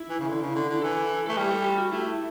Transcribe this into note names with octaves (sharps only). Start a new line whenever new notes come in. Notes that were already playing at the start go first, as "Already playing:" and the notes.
Already playing: E4
E3
C#3
D3
C#3
D3
D3
E3 A4
A3 A4
G3 G4
A4
G4
F#4
A3 E4